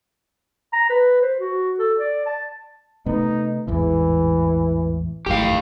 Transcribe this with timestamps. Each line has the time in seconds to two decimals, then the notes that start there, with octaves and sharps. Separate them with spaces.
0.73 A#5
0.89 B4
1.21 C5
1.39 F#4
1.79 A4
1.99 D5
2.26 A5
3.06 C3 A3 B3 D#4
3.67 A1 E2 G#2 E3
5.26 G#1 F#2 A2 G4 F5